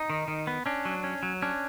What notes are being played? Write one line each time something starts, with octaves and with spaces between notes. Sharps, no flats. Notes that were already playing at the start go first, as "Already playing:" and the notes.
Already playing: D#4
D#3
D#3
B3
C#4 D4
F#3
C#4
F#3
C#4 D4